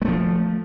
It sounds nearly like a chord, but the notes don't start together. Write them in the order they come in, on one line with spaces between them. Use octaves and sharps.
G#3 A3 F3